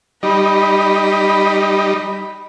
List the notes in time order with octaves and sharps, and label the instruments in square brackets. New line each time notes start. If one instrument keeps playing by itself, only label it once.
[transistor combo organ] G3 D#4 [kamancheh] B5